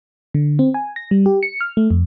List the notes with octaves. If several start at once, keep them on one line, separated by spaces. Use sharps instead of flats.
D3
C4
G#5
A#6
G3
G4
C#7
F6
A3
F2